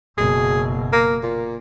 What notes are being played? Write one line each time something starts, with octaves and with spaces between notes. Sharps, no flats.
F#1 B2 G#4
A#3
A#2